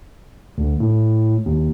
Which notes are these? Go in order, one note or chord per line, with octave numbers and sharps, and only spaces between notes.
D2
A2
D#2